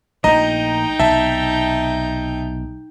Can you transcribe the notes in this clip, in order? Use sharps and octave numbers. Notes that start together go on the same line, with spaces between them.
A#1 A3 D#4 D#5 G5 A#5
B1 C3 E5 A5